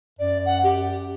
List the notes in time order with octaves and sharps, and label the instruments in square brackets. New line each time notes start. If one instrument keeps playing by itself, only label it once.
[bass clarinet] F#2 [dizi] D5
[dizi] F#5
G4